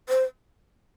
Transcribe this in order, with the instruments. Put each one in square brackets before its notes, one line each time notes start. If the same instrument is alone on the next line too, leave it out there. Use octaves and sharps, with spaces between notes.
[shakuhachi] C5